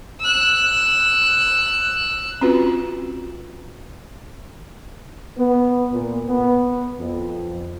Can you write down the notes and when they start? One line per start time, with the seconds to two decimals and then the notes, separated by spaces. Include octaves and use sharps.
0.20 E6 F#6
2.41 C4 C#4 F4 F#4 B4
5.38 B3
5.94 A#2
6.29 B3
6.99 F2